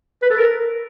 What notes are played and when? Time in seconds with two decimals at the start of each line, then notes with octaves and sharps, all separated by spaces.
0.23 B4
0.30 A4
0.37 A#4